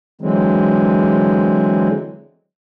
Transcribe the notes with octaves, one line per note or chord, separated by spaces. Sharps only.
D3 E3 F#3 G#3 C4